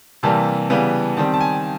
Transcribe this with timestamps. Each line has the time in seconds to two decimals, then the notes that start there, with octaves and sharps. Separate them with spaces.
0.23 C3 E3 G3 A#3 A5
0.70 C#3 E3 G3 B3
1.17 D#3 G3 C4 A5
1.34 A5
1.40 G#5